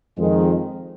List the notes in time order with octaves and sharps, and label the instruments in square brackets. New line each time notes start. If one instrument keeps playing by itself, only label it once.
[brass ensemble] F2 D#3 G#3